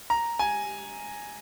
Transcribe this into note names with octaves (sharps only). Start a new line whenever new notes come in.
A#5
G#5